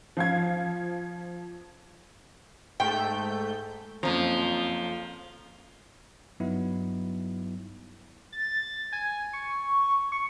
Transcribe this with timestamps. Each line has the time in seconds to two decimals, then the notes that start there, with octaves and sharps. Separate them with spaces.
0.17 F3 F5 G#6
2.80 G#2 A3 G5 G6
4.03 F#1 F2 F3 A#5
6.40 G2 F#3 B3 D#4 E4
8.32 A6
8.92 G#5
9.33 C#6
10.12 C#6